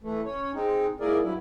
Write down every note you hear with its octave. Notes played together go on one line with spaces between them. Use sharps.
E3 A3
C#4 C#5
G#3 C4 D#4
G#2 A#3 E4 G#4 A#4 D5
G2 F#3 E4